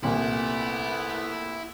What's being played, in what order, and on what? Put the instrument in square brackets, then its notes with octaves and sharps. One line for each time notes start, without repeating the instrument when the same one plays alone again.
[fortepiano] C2 A#2 [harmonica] A3 B3 [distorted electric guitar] E4